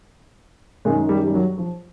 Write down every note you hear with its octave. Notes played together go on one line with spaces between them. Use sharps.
F#2 D#3 G#3
G3
G3
F#3
F3